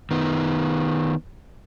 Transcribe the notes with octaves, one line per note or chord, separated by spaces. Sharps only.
D#3 B3